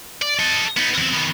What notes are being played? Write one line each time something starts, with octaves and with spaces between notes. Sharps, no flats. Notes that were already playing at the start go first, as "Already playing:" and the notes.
D5
A4 D#5
B3 D#4
E2 C4
D#3 B3